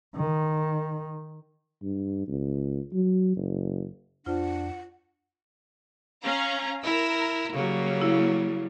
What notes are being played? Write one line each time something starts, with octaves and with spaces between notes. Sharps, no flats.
D#3
G2
C#2
F#3
F#1
F2 D4 F4 C5 F#5
C#4 F5 A#5
E4 A#4 E6
C#3 F#3 G3 A#3
E4